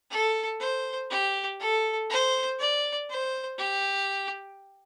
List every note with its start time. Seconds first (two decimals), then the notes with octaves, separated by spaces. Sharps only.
0.11 A4
0.60 C5
1.10 G4
1.60 A4
2.10 C5
2.59 D5
3.10 C5
3.58 G4